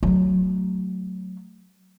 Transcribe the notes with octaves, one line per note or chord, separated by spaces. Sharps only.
F#3 A3